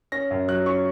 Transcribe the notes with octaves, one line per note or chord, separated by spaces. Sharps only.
C#4 A#6
F#2
F#3 F#6
C#4 C#6